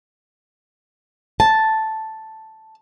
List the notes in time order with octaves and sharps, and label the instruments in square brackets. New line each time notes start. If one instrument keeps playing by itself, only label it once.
[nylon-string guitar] A5